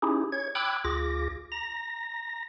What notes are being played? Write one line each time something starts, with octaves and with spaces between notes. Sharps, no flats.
C#4 D#4 E4 G4 G#4
C#5 G#6
G5 B5 D6 E6 F#6 G#6
D2 F4 G#4 D6 A#6
A#5 A#6